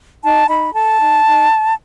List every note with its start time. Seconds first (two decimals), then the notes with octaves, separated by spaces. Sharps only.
0.22 D#4 A5
0.48 D#4 B5
0.74 A4 A5
1.00 D#4
1.26 D#4